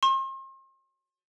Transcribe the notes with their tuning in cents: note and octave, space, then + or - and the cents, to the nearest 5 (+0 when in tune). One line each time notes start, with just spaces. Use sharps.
C6 +40